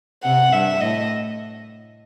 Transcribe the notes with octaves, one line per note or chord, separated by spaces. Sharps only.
C3 F#5
G2 E5
A2 D#5